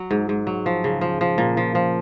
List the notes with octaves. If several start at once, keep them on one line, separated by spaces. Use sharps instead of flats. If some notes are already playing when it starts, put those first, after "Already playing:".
Already playing: F#3
G#2
G#2
F#3
F3
C#3
F3
F3
A#2
F3
F3